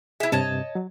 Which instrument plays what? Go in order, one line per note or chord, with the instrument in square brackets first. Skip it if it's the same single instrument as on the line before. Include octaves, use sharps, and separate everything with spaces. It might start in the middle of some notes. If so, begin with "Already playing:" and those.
[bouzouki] E4 E5 [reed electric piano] G#4
[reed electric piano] G2 C3 [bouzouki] C#5 D#5 A5
[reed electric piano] F#3